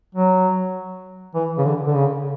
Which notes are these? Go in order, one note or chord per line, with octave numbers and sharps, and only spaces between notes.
F#3
E3
C#3
D3
D3
C#3